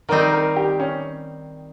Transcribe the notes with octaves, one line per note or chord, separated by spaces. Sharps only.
D#3 G3 C4 D#4 A#4
A#4
G4
C#4